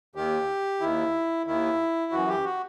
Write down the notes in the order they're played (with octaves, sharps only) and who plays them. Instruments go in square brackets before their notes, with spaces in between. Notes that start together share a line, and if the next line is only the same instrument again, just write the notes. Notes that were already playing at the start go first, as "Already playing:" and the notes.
[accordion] D#2 D#3 G4
D#2 D#3 E4
D#2 D#3 E4
F#2 E3 F#4
G4
F#4